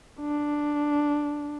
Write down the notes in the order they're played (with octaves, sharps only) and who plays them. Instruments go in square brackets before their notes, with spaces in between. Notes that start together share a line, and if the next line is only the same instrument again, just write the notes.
[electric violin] D4